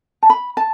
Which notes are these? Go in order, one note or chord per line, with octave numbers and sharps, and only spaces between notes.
A5
B5
A5